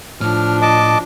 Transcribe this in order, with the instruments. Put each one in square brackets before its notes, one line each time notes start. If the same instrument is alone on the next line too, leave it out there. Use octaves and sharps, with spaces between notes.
[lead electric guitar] A2 [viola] F3 D4 [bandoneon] F6
[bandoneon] D#5 A5 D6